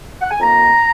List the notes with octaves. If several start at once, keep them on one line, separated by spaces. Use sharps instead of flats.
F#5
G#5
F2 D#3 A#3 A#5